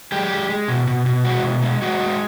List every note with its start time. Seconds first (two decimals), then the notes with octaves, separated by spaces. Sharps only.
0.12 G#3 G4
0.31 G#3
0.49 G#3
0.68 B2
0.87 B2
1.06 B2
1.25 G#3 F#4
1.44 B2
1.62 G#3
1.82 G#3 F#4
2.00 G#3